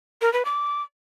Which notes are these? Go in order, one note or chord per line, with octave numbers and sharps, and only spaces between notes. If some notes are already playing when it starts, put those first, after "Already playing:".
A#4
B4
D6